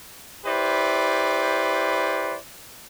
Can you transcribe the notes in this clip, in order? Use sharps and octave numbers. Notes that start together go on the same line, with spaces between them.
E4 G4 B4 C5 D5